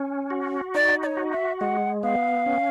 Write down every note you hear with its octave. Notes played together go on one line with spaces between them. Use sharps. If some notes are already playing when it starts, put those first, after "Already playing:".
Already playing: C#4
F#4
D#4 D5
D5
C#5
F#4
E5
G#3 F#5
B3 F5
C#4